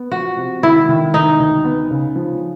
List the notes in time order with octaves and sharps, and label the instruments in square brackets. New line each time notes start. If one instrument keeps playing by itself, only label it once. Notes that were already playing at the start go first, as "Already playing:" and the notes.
Already playing: [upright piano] B3
[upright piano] F3 [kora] F#4
[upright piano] C3
[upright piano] D#3 [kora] E4
[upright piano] D#3
[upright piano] D#3 [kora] D#4
[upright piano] D2
B3
C#3
F3